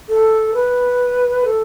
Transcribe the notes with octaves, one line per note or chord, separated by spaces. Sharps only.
A4
B4
A4